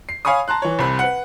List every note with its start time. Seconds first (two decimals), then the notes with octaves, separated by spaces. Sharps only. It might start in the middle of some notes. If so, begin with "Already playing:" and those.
0.09 C7
0.25 C#5 F5 G#5 B5 C#6 D#6
0.48 A5 A#5 C6 F#6
0.62 E3 C#5
0.79 C2 C3 C4 B5
0.99 B4 F#5